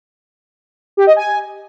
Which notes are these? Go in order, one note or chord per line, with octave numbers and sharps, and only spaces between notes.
G4
D#5
G#5